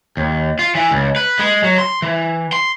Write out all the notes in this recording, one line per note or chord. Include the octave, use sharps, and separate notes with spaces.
D#2
F4
E3
C#2
B4
G#3
F#3
C6
E3
C6